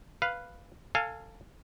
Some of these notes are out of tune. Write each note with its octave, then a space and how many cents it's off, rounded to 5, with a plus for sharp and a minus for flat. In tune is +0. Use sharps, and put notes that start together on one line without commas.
B4 +0 F5 +0
A4 +25 F5 +0 G#5 +0